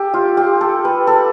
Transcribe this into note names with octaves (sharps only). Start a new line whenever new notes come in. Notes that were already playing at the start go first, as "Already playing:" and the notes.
Already playing: G4 A4
F4
G4
A4
B4
A4